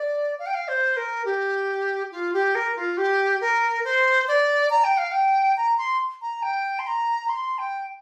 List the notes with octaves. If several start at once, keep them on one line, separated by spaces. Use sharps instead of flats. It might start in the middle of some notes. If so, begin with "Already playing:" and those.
Already playing: D5
F5
G5
F5
C5
A#4
G4
F4
G4
A#4
F4
G4
A#4
C5
D5
A#5
G5
F5
G5
A#5
C6
A#5
G5
C6
A#5
C6
G5